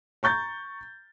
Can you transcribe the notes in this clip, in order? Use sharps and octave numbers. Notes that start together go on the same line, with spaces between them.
A#5 C#6 G6 A6